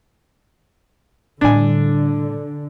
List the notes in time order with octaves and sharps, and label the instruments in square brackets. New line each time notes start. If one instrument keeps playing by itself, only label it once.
[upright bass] A2 G3 [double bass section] D3 [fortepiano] D4 G#5